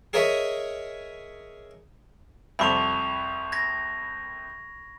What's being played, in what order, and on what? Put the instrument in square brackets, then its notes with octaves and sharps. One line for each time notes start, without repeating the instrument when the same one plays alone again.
[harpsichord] G#4 A#4 C#5 D#5 E5
[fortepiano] C2 F2 C3 [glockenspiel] B5 C#6 F7
[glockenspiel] G#6 A#6